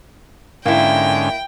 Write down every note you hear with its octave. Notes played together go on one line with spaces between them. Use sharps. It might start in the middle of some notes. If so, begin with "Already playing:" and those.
G#2 D3 A#3 C#4 E4 G5